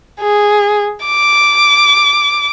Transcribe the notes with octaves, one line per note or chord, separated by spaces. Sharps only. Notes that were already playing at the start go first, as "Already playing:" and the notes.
G#4
D6